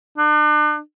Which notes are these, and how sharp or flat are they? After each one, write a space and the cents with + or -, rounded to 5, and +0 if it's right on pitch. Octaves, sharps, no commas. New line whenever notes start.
D4 +40